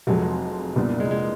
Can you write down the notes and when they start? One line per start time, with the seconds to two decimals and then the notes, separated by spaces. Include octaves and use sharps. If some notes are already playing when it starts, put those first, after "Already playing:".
0.07 F1 F2 C3 F3 F#3 G#3
0.76 C2 A#2 G3 B3 D4
1.00 G#3
1.11 G#3